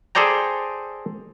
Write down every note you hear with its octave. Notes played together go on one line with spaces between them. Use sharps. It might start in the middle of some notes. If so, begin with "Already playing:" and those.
G#4 A4 C5 D5 G5 A#5